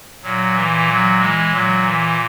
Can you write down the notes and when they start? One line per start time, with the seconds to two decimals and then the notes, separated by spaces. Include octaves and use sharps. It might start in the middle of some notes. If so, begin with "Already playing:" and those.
0.23 A#2 F#3
0.55 E3
0.88 F#3
1.19 E3 G#3
1.51 A#2 F#3
1.83 E3